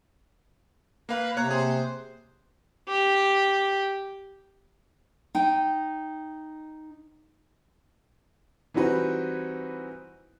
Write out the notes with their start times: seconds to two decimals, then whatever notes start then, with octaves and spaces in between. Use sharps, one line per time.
1.09 A#3 B4 F5
1.37 C3 A#3 C#5 A#5 F#6
1.51 G#4 C5
2.89 G4
5.35 D#4 G5
8.74 E3 G3 C4 D#4 F#4 B4